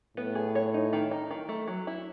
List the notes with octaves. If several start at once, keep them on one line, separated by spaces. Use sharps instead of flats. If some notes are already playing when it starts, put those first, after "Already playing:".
A2 B3
G#4
C#5
D#4
D#3
D#4
D#3
A3
F#3
E4